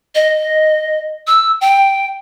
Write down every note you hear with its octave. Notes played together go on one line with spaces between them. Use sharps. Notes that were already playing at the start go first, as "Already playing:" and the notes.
D#5
E6
G5